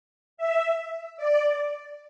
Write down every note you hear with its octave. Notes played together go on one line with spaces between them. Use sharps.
E5
D5